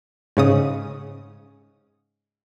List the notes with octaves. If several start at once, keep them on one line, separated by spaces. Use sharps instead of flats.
G#2 C#3 D#6